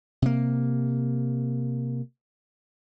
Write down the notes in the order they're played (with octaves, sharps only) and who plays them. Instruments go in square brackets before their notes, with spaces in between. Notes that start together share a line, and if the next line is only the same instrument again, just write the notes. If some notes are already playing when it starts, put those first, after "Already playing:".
[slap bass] C3 A#3